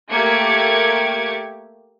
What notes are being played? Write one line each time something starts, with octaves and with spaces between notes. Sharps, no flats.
A3 A#3 G4 D6 G#6 C#7